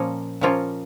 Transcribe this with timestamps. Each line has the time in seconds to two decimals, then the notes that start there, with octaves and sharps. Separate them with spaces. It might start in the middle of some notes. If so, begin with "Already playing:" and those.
Already playing: A#2 F3 A#3 C#4
0.41 A#2 F3 A#3 C#4 F4